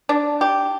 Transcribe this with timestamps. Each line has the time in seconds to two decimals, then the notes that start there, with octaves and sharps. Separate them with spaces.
0.09 D4
0.41 G4